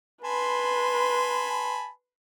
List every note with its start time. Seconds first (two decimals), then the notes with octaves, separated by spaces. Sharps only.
0.24 B4 G#5 A5 B5 C6